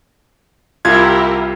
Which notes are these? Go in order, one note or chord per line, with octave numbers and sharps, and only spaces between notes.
C2 E4 F4 G4 A#4 G#6